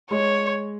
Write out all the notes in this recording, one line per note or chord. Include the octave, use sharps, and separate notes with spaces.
G#3 C#5